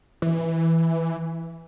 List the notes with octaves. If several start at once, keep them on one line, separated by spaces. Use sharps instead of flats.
E3